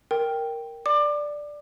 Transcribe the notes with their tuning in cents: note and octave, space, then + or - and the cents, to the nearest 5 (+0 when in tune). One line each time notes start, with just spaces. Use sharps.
A#4 +0 G5 +0
D5 +0 D6 +25